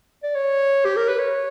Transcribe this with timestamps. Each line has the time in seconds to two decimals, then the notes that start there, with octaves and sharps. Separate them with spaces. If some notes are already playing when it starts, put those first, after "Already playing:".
0.23 D5
0.35 C#5
0.85 G4
0.96 A#4
1.09 B4
1.19 C#5